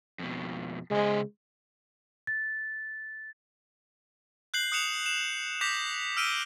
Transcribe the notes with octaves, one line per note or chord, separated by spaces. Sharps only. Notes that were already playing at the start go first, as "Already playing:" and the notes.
F2 B2
C#3 G#3 C5
A6
F#6 G6 C7 F#7
D#6 F#6 C#7 E7 F7
E7
D6 G6 A#6 B6 E7 F7
E6 F6 D7 D#7 G7